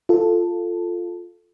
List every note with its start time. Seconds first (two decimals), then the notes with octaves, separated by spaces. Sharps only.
0.09 F4 A4